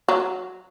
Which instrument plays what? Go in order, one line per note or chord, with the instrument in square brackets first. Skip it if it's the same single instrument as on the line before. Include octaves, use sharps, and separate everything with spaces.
[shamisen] F#3